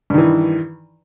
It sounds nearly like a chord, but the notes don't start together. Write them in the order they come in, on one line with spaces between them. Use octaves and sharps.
G2 D#3 E3